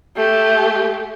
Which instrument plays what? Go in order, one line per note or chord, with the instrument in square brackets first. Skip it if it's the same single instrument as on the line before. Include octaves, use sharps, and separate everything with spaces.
[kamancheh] A3 G4